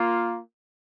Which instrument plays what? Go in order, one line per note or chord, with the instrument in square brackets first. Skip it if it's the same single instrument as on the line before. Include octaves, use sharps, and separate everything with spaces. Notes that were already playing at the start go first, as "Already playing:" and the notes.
Already playing: [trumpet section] A#3 F4